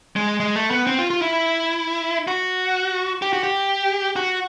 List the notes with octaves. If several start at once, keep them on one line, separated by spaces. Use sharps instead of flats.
G#3
G#3
A3
B3
C4
F4
F4
E4
F#4
G4
F#4
G4
F#4